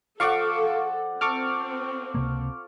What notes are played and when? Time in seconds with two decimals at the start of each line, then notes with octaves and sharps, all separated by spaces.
0.20 F3 A4 D5 F5 F#5 C#6 D6
1.21 C4 A4 C#6 D6 F6
2.15 C#2 C3 A#3